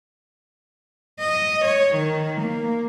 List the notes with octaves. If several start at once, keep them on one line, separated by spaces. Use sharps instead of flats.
D#5
C#5
D#3
A#3